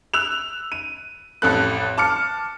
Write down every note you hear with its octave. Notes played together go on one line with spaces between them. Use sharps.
E6 F#6 E7 F7
D#7
A1 F2 A4 F#6
A5 D6 F6 C#7